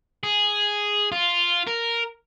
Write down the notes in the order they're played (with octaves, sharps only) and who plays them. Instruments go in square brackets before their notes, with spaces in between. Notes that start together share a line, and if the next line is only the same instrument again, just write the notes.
[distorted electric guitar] G#4
F4
A#4